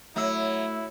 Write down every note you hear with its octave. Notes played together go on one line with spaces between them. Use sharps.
F#3 A3 E4 E6